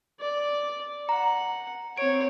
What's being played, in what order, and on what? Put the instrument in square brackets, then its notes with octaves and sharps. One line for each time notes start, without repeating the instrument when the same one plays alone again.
[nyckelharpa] D5
[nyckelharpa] F#5 [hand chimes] A#5
[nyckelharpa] C4 C#5 [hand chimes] D7